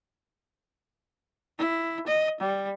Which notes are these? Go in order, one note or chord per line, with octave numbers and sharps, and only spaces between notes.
E4
D#5
G3